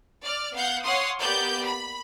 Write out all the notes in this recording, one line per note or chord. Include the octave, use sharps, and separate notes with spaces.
D5 F6
B3 F5 F#5 G6
C#5 F5 F#5 C6 D#6
A#3 B3 G4 D5 G6
B5